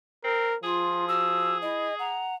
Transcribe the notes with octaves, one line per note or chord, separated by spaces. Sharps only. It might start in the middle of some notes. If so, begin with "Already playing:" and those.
C4 A#4
F3 F4 G#4
F#4 E6
E4 D#5
F#5 A#5